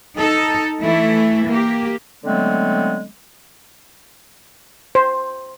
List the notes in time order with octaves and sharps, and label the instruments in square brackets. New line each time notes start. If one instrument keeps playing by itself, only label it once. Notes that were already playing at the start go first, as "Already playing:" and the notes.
[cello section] D#4 A4
E3 A3 E4
A#3 G4
[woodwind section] D3 F#3 G#3 A3 B3 C4
[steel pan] C5